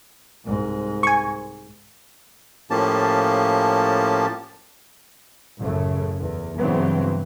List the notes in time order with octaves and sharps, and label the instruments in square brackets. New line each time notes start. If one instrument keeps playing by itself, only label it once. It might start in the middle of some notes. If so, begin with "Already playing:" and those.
[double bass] C2 G#2
[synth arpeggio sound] G#5 C#6
[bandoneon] A2 F3 A#3 C#4 G4 A5
[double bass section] A1 F#2 C#3 A3
E2
G2 C#3 E3 F#3 B3 C4